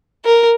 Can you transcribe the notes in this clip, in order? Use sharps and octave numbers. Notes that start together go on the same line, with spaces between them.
A#4